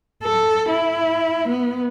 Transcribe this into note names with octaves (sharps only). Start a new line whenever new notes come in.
A4
E4
B3